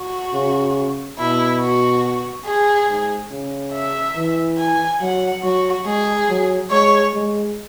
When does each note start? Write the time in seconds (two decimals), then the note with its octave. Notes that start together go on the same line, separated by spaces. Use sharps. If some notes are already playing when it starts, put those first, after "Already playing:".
Already playing: F#4
0.34 C#3
1.19 B2 E4
1.61 F#4
2.46 G#4
2.89 G#2
3.31 C#3
3.74 E5
4.16 E3
4.58 G#5
5.01 F#3 F#5
5.43 F#3 F#4
5.86 G#3 G#4
6.29 F#3
6.71 G#3 C#5
7.14 G#3